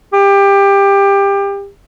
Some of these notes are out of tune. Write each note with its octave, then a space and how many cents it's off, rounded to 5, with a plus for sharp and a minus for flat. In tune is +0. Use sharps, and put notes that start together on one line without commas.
G4 +20